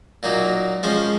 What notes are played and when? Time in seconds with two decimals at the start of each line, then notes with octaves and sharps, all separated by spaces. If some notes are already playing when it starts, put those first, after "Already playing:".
0.23 A#2 F#3 A#3 D#4
0.83 F3 G#3 C#4 C5